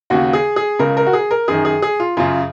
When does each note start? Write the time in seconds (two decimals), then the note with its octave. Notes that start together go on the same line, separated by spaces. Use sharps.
0.10 D#2 C#3 F#4
0.33 G#4
0.56 G#4
0.79 C#2 C#3 A#4
0.97 A#4
1.07 F#4
1.13 G#4
1.31 A#4
1.48 F#2 D#3 G#4
1.65 G#4
1.82 G#4
2.00 F4
2.17 F#2 C#3 F4